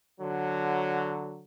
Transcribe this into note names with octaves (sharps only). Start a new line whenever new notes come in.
D3 F#3